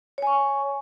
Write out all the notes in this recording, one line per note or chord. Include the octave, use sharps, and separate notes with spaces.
C#5 G#5 C#6